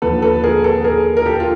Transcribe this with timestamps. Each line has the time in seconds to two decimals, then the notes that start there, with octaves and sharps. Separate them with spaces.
0.02 D#2 D3 F3 A4 B4
0.22 A4 B4
0.43 G#4 A#4
0.64 A4 B4
0.84 G#4 A#4
1.17 A#4
1.26 G4 A4
1.40 F4